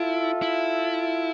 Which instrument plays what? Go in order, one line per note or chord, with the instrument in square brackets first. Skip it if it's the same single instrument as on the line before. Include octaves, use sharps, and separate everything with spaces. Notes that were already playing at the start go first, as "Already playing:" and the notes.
Already playing: [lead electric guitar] E4 [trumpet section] F4 A4 E5
[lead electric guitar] E4